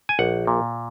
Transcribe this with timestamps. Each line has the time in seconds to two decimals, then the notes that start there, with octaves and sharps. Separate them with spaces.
0.09 G#5
0.19 A#1 F#5
0.47 A#2